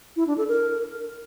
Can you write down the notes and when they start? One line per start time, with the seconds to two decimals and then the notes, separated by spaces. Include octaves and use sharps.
0.16 E4
0.27 D4
0.38 A4
0.48 A#4